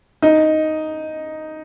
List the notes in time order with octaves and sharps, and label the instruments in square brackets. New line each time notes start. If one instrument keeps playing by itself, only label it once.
[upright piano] D#4